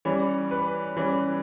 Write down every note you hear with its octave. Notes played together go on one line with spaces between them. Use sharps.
E3 G3 C#4 C#5
B4
E3 G3 C#4